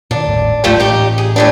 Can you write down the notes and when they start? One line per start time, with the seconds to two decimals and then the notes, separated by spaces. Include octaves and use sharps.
0.11 A#2 D#3 D4
0.25 D#1 G#1 A2
0.64 D1 A1 G#2 F3 G3 A3
0.80 A1 D#4 G4
1.18 G#4
1.36 A2 G3 D4